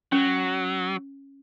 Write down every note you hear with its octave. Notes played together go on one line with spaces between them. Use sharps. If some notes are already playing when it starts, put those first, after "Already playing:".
F#3 C#4